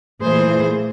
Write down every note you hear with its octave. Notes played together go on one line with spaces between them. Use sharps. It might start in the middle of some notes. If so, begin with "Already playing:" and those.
A#2 E3 A3 G#4 C5